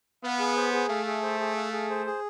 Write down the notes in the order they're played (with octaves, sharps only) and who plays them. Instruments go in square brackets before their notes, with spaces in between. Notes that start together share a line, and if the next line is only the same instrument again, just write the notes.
[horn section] B3 [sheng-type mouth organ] F5
[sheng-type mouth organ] G#4
C5
G#4
[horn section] A3 [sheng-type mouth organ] F5
[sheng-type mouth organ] G#4
C5
G#4
F5
G#4
C5
G#4